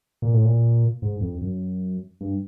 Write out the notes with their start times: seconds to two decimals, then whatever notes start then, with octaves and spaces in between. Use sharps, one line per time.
0.22 A#2
0.33 A2
0.45 A#2
1.02 G#2
1.21 F2
1.41 F#2
2.21 G2